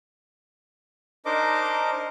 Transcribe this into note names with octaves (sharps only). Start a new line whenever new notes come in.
D4 D#4 A#4 C5 D#5 D6